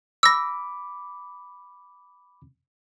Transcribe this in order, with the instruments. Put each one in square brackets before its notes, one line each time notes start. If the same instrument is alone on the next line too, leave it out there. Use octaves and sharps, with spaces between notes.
[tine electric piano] B5 D6 [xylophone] E6 A#6